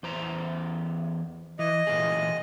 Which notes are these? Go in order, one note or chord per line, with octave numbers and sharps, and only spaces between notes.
E2 C5 A#5
E3 D#5
A#2 E3 G#4